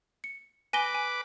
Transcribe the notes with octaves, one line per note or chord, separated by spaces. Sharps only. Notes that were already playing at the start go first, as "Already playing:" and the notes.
C#7
B4 G#5 D6 A#6 G7
G#5